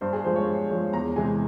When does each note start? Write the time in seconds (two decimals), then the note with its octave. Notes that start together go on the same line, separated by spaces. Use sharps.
0.01 G2 C5
0.13 G#4
0.24 F3 G#3 C5
0.35 C#5
0.47 G2
0.70 F3 G#3 C#5
0.93 E2 A#5
1.16 C3 E3 G#3 G#5